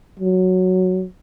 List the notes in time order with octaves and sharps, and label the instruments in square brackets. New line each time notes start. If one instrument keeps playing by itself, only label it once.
[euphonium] F#3